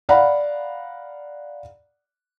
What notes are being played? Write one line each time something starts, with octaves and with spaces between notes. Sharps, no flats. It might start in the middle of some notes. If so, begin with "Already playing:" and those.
D5 F5 F#5 A#5 B5